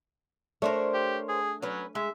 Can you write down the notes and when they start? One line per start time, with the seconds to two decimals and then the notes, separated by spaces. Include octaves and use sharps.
0.62 A3 D4 A#4 C5 C#5
0.94 G4
1.29 G#4
1.62 F#3 C#4 B4
1.95 G#3 E5